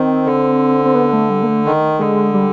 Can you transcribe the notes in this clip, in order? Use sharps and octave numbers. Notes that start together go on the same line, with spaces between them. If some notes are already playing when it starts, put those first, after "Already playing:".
Already playing: D#3 C4
D3
C4
B3
A3
G3
A#3
A3
D#3
D3 G#3
G3